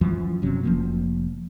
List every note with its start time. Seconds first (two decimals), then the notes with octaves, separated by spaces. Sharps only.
0.01 F#2 E3 F3
0.42 F#1 C3 F#3 C#4
0.63 F1 F3 A#3